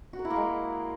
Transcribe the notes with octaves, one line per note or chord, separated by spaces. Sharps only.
F#4
A#4
E4
A#3
G#3